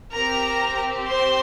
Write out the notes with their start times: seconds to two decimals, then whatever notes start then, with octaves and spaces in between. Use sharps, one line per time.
0.15 C4 G4 A#4 A#5
1.08 C5 C6